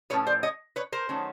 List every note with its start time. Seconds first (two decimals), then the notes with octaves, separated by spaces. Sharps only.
0.10 A2 F3 A3 C#4 B4 C#5
0.27 C5 D5
0.43 C#5 D#5
0.76 B4 C#5
0.92 A#4 C5
1.09 D#3 F#3 A3 C#4